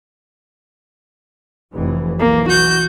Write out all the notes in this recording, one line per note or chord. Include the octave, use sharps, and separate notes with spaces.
F1 E3
B1 E3 A#3
F#4 G6